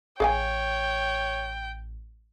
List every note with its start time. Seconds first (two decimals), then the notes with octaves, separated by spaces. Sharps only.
0.20 A1 G#4 C#5 F5 G5 G#5